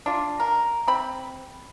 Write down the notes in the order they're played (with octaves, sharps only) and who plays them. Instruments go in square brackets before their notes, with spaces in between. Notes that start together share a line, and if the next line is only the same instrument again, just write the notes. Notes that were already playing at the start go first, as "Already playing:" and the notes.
[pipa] D4 F4
A#4
C4 B5